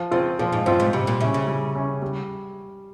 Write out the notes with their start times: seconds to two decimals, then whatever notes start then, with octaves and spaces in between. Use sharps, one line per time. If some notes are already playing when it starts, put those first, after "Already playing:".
Already playing: F3
0.11 C#3 C4 F4
0.39 A#2 F3
0.52 G#2
0.66 G2 C4 F4
0.80 G#2
0.93 C3 G3
1.07 A#2
1.21 C#3 C#4 E4
1.34 C#3
1.47 G3
1.75 C#4 E4
2.02 G3